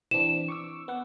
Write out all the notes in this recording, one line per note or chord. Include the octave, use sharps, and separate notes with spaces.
E3 C4 D4 E7
C#6 D6 E6
B3 F#5